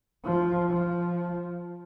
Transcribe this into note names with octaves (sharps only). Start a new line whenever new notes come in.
F3
F3